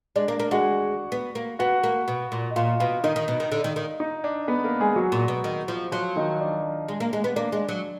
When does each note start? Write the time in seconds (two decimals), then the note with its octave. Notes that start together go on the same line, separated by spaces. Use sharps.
0.16 G#3 D4 D5
0.27 A#3 D4 D5
0.40 A#3
0.51 G#3 F#4 F#5
1.12 B3
1.35 A#3
1.59 B3 F#4 F#5
1.83 A#3
2.08 B2
2.32 A#2
2.51 D#5
2.56 A#2 F4 F5
2.80 B2 F4 F5
3.04 D#3 D#4 D#5
3.16 D#3
3.28 B2
3.40 D#3
3.52 D3
3.64 D#3
3.76 D#3
4.00 D#4 D#5
4.24 D4 D5
4.48 B3 B4
4.64 A#3 A#4
4.80 G#3 G#4
4.96 F#3 F#4
5.12 A#2
5.28 B2
5.44 D#3
5.68 F3
5.92 F3 F#3 F4
6.16 D#3 D#4
6.40 D4
6.89 G#3
7.00 A#3
7.13 G#3
7.24 B3
7.36 A#3 D4
7.52 G#3
7.69 F#3